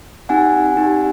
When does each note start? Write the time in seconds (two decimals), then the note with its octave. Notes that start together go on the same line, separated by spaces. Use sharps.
0.29 C4 D#4 G4 F#5 G#5
0.76 C4 D#4 G4